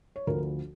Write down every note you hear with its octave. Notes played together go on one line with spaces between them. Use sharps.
C#5
D2 D3 F3 A#4